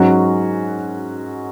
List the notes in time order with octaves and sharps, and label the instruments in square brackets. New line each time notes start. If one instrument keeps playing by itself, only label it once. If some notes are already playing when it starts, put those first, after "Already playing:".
Already playing: [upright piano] G#2 F#3 C#4 F#4